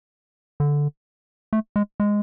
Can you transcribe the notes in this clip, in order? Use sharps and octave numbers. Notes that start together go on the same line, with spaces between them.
D3
A3
G#3
G#3